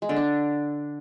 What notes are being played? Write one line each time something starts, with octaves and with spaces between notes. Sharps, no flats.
G#3
D3
D4